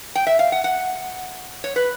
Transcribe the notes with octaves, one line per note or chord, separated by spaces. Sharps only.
G5
E5
F5
F#5
F#5
C#5
B4